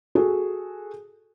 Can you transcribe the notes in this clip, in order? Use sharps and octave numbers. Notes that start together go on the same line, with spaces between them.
F#4 G#4 A4